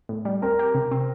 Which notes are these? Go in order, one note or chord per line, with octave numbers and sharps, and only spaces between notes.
A2
G3
C4 A#4
G4
C3
C4